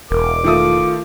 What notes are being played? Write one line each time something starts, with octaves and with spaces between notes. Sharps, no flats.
E1 A#4 D6
D#3 A3 F4 D#6